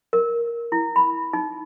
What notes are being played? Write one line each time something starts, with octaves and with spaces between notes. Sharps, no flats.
A#4
E4
B5
D#4